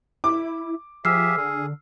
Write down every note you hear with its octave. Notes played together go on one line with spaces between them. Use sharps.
E4 D6
F3 G4 G#4 E5 E6 F6 C7
D3 G#4